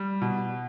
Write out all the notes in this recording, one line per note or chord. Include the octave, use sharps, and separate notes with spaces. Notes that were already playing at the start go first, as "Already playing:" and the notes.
Already playing: G3
B2